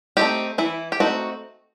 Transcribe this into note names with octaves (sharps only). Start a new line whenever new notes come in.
A3 C4 D#4 G4
E3 E4
G4
A3 C4 D#4 F#4